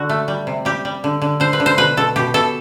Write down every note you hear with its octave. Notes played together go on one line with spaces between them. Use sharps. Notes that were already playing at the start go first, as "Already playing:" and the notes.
Already playing: D3 F#4
A3
G3
C3
G3 G4
G3
D3
D3
D3 C5
B4
D3
C5
B2 B4
B2 A4
B2 G4
B2 A4